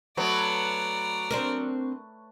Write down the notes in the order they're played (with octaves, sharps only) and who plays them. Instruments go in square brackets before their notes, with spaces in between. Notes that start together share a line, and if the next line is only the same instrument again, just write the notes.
[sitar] F#3 B3 [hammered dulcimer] A3 B4 C#5 [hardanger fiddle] D5 A#5
[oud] C4 D4 A#4